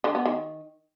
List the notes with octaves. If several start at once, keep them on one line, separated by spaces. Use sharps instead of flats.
D3
B3
D#3